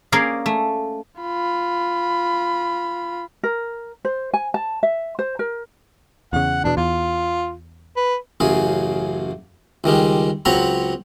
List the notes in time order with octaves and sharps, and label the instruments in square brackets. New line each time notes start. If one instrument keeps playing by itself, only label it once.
[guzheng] A#3 C#4 G#4 A#4 D5 F5
A3
[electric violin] F4 B5
[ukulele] A#4
C5
G#5
A5
E5
C5
A#4
[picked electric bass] E2 C#3 [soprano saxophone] F#5
[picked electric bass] E2 B2 [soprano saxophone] D4
[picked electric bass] E2 [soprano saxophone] F4
[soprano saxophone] B4
[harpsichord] A1 F#2 C#3 G#4
C#2 D#3 G3 G#3
C#2 F#3 C4 C#5 A#5 B5